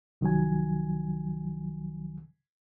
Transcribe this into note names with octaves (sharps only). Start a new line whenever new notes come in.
C2 D#3 F3 F#3 G#5